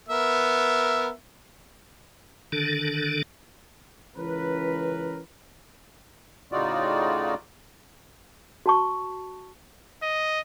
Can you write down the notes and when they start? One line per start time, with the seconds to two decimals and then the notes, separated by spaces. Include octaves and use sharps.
0.09 B3 A#4 E5
2.52 D3 D#3 D4 A4
4.16 C#2 E3 C#4 A#4 B4
6.52 A2 C#3 D#4 F4 F#4 D5
8.66 F#4 A5 C#6
10.03 D#5